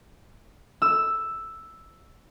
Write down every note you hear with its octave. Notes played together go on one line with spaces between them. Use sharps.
E6